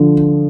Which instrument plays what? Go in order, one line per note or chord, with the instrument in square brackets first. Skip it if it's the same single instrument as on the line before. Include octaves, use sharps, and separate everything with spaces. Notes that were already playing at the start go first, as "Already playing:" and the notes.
Already playing: [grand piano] D3 F3